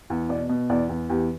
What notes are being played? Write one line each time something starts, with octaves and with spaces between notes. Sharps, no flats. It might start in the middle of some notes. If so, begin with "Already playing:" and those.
E2
B2 D5
B2
E2 D5
E2
E2 G4